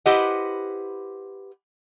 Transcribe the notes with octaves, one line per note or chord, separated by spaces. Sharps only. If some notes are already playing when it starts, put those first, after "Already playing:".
E4 G4 B4 C5 D#5 F#5